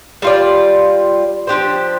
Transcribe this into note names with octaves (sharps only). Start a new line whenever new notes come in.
G3 F4 D5
F3 D4 G4 C5